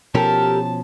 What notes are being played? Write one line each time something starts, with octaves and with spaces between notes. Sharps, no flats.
B2 F3 C#4 G4 A4 A#4 A5